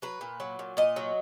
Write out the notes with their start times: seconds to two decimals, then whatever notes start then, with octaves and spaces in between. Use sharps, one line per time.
0.02 F#3 B4
0.21 A#2
0.40 F#3
0.59 A#2
0.77 A#2 D#5
0.96 F#3